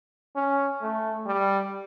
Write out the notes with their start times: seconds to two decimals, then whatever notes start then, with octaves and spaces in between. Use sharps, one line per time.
0.36 C#4
0.82 A3
1.26 G3